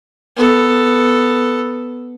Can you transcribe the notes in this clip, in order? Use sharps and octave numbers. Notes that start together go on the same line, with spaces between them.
B3 A4